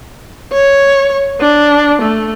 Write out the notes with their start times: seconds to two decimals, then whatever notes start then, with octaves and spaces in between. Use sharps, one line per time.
0.53 C#5
1.40 D4
2.02 A3